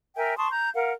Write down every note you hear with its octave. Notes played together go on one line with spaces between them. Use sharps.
A#4 E5 G5 G#5
A5 C6 C#6 D#6
A#5 G6
A#4 F5 F#5